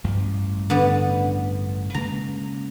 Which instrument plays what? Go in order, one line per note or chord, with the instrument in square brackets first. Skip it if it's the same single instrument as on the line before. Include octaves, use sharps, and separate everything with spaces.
[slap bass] A1 G2 F3
[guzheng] D3 B3
[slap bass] C#3 G#3 A#3 [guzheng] A#5